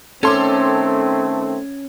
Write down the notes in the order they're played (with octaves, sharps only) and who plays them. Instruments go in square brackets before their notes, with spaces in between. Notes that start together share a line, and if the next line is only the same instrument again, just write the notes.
[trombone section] D#3 A3 C4 [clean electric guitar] C#4 [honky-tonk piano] A4 C6 D6